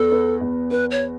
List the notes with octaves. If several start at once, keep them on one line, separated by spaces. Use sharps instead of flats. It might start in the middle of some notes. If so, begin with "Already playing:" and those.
Already playing: E2 B3 A4
B3
E2
B3 B4
C#5